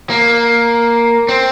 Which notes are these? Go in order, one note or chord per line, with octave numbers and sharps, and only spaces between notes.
A#3
C4